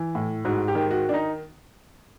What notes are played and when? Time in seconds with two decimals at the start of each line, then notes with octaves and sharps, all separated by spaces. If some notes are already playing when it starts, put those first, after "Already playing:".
Already playing: E3
0.15 A2
0.45 G#2 F#4
0.68 G4
0.75 D#3
0.91 F#4
1.09 D4
1.14 D#4